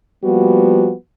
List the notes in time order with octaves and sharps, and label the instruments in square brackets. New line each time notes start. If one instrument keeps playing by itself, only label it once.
[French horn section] F3 G3 A#3 B3 F#4